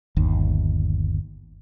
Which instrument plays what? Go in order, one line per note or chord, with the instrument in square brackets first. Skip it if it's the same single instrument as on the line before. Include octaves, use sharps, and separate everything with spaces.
[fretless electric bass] G1 D#2